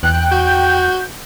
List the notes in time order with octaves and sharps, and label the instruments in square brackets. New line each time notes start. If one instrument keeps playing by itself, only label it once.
[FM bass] E2 [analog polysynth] G5 [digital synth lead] F#6
[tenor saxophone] F#4 [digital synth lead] G6